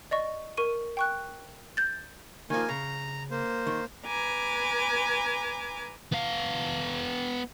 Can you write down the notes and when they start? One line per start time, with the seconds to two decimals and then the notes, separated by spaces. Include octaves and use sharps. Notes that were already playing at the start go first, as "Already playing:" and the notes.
0.11 D5 D#5 C#6
0.57 A#4 C#6 D#7
0.97 G5 C#6 F#6
1.77 G6 A6
2.50 D#3 F3 A#3 G#5
2.69 C#3 A#5
3.31 A#3 C5
3.67 D#3
4.06 B4 G#5 A#5 D6
6.12 B3 F5